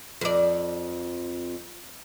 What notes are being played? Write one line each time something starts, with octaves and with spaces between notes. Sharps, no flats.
F2 D5